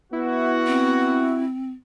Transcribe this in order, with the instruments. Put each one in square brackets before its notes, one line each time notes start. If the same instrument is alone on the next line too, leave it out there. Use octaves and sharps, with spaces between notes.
[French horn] B3 [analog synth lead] E4 [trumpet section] F#4
[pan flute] C4